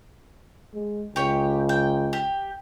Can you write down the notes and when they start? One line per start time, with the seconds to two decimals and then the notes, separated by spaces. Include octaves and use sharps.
0.74 G#3
1.16 C#2 G4 C#5
1.69 G5
2.13 G4